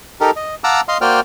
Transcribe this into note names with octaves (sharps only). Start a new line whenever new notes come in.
D#4 G4 A4 A#4
D#5
F5 F#5 A5 A#5 D6 E6
D#5 F5 C6
A#3 F#4 C5 D5 G5 F6